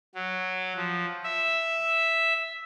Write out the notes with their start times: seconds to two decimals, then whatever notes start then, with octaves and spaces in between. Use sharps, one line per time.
0.15 F#3
0.76 F3
1.24 E5